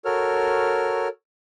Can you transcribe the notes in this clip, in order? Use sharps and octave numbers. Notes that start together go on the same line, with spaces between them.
F#4 A4 A#4 C#5 F6